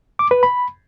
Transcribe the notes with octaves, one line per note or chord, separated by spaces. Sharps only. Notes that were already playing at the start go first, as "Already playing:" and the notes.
D6
B4
B5